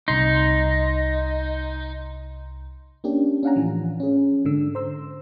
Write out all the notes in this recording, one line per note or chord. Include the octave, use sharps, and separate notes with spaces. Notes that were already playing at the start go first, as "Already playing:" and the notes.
C2 D#4 C6
A#3 C#4 D4 G4
C#4 D4 F5 F#5 G#5 A#5
A2 E3 F3
C#4 G#4
G#2 D3 E6
C5 A#5 C6 E6